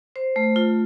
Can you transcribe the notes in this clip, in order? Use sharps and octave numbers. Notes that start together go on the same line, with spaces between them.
C5
A3
F4